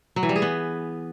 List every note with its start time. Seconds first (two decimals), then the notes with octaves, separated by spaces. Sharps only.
0.16 F#3
0.23 E3
0.29 G3
0.36 G#4
0.42 B3